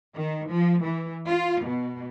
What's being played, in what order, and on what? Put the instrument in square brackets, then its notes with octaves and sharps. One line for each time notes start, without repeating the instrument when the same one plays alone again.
[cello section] D#3
F3
E3
F4
B2